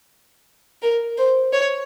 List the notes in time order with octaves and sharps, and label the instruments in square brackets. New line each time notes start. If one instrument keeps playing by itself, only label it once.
[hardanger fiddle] A#4
C5
C#5